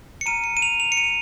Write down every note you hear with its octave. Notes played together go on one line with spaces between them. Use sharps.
C#7
A#5 F6 D#7
C#7
D#7
F7
F7
C#7
D#7